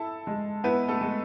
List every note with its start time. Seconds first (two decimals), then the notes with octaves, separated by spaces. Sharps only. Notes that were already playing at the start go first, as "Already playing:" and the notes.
Already playing: E4 A4 A5
0.27 G#3
0.64 B3 E4 B4
0.89 A3 A4
1.01 G#3